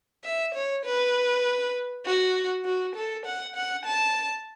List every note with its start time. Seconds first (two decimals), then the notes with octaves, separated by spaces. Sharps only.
0.24 E5
0.55 C#5
0.85 B4
2.05 F#4
2.65 F#4
2.96 A4
3.26 F#5
3.56 F#5
3.85 A5